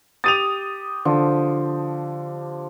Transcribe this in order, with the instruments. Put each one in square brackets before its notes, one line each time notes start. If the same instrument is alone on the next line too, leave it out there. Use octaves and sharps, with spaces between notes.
[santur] G4 D#6 [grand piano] A6 D#7 F7
[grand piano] D3 [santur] F3